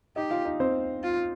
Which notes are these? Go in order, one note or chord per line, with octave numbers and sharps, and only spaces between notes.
D#4 G4 D#5
F4 F5
D#4 D#5
C4 C5
F4